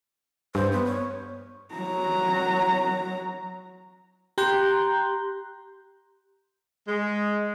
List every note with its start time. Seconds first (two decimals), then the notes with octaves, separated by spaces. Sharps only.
0.55 G2 C5
0.72 B3
0.86 C#5
1.75 F#3 A#5
4.38 G4 A#5 C6 F#6 G6
6.88 G#3